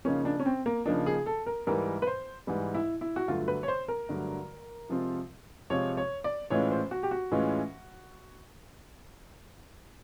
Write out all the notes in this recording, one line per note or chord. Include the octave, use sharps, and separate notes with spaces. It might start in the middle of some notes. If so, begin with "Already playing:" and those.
C#3 F3 A#3 C#4 D#4
D4
C#4
C4
A#3
C#3 F3 A#3 D4 D#4
G#4
A4
A#4
G#2 E3 G3 A#4
B4
C5
G#2 E3 G3
E4
E4
F#4
G2 D3 F#3 A3 F4
B4
C#5
C5
A#4
G2 D3 F#3 A3
C3 F3 G#3 C4 F4
C3 F3 G#3 C4 F4 C#5
C#5
D5
A2 E3 G#3 C#4 F4 C#5
C5
F#4
G4
F#4
A2 E3 G#3 C#4 F4